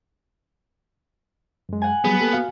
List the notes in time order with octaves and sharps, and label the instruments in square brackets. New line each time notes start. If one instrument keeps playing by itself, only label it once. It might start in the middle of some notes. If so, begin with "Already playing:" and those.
[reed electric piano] F#2 G#3
[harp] F#5 G#5
[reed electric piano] F#3 G3 G#4 [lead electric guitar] B3
[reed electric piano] A#3 G4 A4
F#4 F5